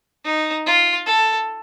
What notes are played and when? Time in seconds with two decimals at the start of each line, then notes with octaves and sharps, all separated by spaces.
0.25 D#4
0.66 F4
1.06 A4